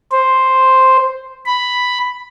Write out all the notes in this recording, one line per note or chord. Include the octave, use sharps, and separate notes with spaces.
C5
B5